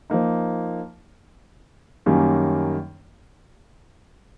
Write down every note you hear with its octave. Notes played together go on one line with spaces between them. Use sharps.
F3 A#3 D#4
F#2 D#3 G3 A#3 C#4